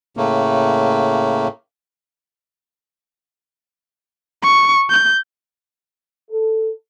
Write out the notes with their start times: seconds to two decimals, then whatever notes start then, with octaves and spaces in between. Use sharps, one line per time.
0.17 A2 C#3 A3 A#3
4.43 C#6
4.90 G6
6.31 A4